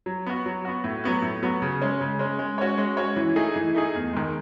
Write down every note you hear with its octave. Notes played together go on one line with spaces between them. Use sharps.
F#3
B3 F#4
F#3
B3 F#4
A2
F#3 B3 F#4
A2
F#3 B3 F#4
C#3
G#3 C#4
C#3
G#3 C#4
G#3
C#4 F#4 C#5
G#3
C#4 F#4 C#5
E3
A3 D#4 G#4
E3
A3 D#4 G#4
E2
D#3 G#3